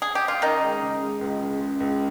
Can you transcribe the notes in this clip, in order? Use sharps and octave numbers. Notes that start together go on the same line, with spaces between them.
G#4
G4
F4
D#3 C#4 D#4
G#3
C#3
G#3
C#2
C#3
G#3
C#2